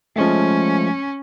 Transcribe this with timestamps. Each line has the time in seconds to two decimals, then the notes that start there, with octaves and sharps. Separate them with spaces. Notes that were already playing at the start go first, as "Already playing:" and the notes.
0.16 F3 G#3 A3 C#4